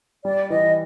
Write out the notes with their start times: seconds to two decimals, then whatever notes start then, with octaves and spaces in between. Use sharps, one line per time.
0.24 G3 D5
0.50 E3 D#5